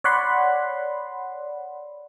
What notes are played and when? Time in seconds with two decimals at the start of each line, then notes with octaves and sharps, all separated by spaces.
0.04 C#5 D5 F#5 B5 C6